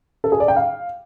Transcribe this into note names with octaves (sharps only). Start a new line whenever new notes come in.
A4
G#4
D5
G5
F5